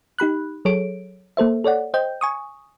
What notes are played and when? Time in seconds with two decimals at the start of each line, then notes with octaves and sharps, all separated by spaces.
0.18 D#4 G4 B5 F#6
0.65 F#3 G#4 A4 C#5 D7
1.37 A#3 A4 C5 E5
1.64 A4 C#5 D5 F#5
1.94 C5 D#5 G5 G6
2.21 G#5 C#6 D#6